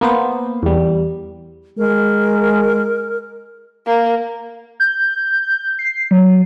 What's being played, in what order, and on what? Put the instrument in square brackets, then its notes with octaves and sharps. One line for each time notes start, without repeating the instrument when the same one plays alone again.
[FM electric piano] A#3 B3 C5
E2 G3
[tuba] G#3 [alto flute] A#4
[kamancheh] A#3
[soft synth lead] G6
C7
F#3